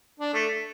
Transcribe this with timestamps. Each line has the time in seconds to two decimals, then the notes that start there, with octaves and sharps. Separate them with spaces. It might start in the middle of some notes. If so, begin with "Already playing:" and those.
0.19 D4
0.33 A3